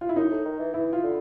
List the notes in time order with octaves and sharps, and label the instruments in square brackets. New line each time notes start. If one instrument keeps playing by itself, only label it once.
[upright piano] F4
E4
[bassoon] F#2 [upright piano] D#4
[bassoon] A2
D#3
E3
[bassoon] E3 [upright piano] E4
[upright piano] F4
[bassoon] D3